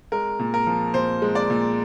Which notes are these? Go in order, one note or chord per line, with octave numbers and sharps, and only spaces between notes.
G#3 A#4
A#2
A#4
F3
A#2 C5
G#3
D5
A#2